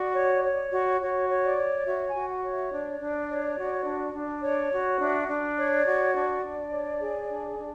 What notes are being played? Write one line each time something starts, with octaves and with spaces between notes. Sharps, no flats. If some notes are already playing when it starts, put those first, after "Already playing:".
Already playing: F#4 D5
C#5
C#5
F#4
F#4 C#5
C#5
D5
C#5
F#4 E5
G#5
F#4
F#5
C#5
E5
D4 D5
D4
C#5
F#4
D4
D4
C#5 D5
F#4
D4 E5
D4
C#5
D5
F#4
D4 D5
D4
C#5
G#4
D4
D4